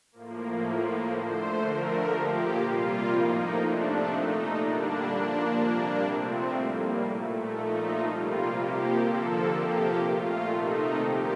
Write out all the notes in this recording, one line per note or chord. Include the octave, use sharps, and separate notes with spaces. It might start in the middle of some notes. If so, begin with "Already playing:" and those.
A2 F3 A#3
A2 F3 A#3
D3 A3 C5
D3 F3 A3 A#4
A#2 F3 A#3 G4
C3 G3 A#3 F4
A2 F3 A#3 D#4
C3 F3 A3 D4
A#2 A3 D#4
D3 G3 A#3 D4
A#2 F3 A#3 D4
C3 G3 A#3 D4
C3 F3 A3 C4
A2 G3 A#3
A#2 A3
A#2 F3 A3 D#4
C3 G3 A#3 F4
C3 F3 A#3 G4
D3 F3 A#3 A4
C3 F3 A#3 G4
A#2 A3 F4
C3 D#3 A3 D#4
A#2 F3 A#3 G4